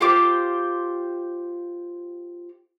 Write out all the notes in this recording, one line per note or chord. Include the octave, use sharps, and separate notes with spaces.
F4 G4 C5 D6